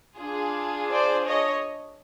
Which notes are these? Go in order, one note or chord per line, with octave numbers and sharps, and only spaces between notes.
D4 F4 G#4
C5 D5
C#5 D#5